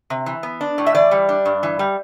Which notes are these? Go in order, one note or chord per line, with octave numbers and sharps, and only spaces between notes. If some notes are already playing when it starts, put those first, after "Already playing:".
C3
E3
B3
D4
A2
E5
E3 D5
G3
D4
G2
E3
G3